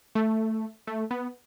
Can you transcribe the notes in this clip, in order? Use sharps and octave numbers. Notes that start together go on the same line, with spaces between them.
A3
A3
B3